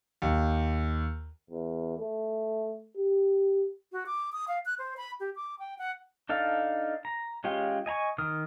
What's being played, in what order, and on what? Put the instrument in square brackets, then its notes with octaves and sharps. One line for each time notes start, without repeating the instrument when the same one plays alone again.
[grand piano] D#2
[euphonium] E2
A3
G4
[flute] F#4
D6
D#6
F5
F#6
C5
B5
G4
D6
G5
F#5
[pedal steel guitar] D4 D#4 A4 F5
A#5
G#3 C#4 F4 G4
D#5 G#5 A#5 C#6
D#3 D#6 F6